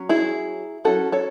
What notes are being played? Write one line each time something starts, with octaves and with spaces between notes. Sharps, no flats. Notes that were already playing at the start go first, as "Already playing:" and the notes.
Already playing: F#3 C#4
E4 G#4
F#3 C#4 E4 F#4 A4
A4 C#5